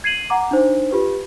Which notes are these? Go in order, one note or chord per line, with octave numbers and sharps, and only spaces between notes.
G#6 C7 D#7 F#7
F#5 A#5 D6
D4 D#4 C5
F4 G4 B4